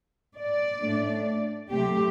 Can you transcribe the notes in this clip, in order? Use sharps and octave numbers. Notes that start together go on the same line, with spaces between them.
D5
A2 A3 D4
C3 F#3 A3 C4 G4